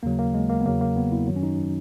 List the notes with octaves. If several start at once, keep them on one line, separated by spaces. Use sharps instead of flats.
D#2 C#3 F#3 A#3
A#3
G#3
A#3
B3
E2 C#3 F#3 A#3
A#3
B3
E4
F#2 D#3 F#3
C#4
D#4